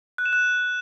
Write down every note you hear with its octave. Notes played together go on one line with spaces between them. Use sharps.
F#6
E7
F#6